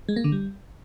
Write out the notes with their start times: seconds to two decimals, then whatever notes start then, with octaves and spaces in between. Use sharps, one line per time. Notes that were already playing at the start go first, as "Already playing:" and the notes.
0.09 G#3
0.16 A#3
0.24 D3
0.32 G3